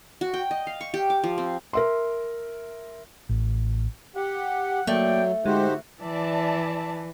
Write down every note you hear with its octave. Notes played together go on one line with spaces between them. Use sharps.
F#4
G5
D#5
F5
C#6
G4
D6
F3
C4
A#4 E5 C6
A1
G4 F#5
F#3 A3 A#3 D5 G5
G#2 D3 G#3 D#4 F#4 G4 C5
E3 D5 E5 A5